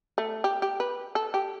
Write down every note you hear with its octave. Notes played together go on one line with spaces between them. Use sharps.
A3
G4
G4
B4
A4
G4